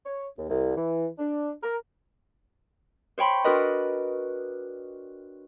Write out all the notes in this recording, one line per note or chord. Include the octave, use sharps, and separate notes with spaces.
C#5
D#2
C2
E3
D4
A#4
C5 C#5 G5 B5 C6
D4 F#4 A#4 B4 D#5